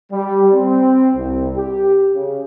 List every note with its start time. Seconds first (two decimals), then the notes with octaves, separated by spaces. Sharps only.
0.12 G3
0.53 C4
1.16 C2
1.56 G4
2.14 C#3